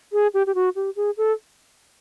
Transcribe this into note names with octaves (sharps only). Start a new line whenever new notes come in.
G#4
G4
G4
F#4
G4
G#4
A4